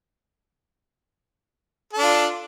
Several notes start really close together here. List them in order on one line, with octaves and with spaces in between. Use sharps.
A4 D4 F4